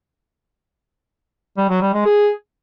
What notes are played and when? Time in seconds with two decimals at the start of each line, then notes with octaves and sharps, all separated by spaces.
1.57 G3
1.69 F#3
1.81 G3
1.93 G#3
2.05 G#4